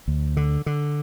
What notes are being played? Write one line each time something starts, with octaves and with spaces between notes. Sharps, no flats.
D2
D3
D3